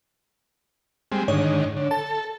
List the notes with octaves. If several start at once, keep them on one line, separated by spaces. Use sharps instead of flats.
G3 G#3 C4
G#2 D3 D#3 C#5
D3
A4 A5